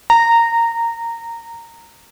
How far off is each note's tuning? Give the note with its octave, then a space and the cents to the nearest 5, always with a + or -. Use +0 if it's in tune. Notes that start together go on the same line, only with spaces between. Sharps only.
A#5 -15